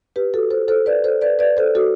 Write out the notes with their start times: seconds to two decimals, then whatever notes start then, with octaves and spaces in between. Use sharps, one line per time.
0.16 G4 B4
0.34 F#4 A4
0.51 A4 C5
0.68 A4 C5
0.86 B4 D5
1.04 A4 C5
1.21 B4 D5
1.39 B4 D5
1.57 A4 C5
1.75 F#4 A4